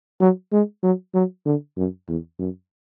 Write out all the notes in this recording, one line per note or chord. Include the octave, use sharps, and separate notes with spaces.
F#3
G#3
F#3
F#3
D3
F#2
E2
F#2